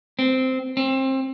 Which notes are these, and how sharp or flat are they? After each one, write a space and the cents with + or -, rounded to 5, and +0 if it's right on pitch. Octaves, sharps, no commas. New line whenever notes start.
C4 -10
C4 +25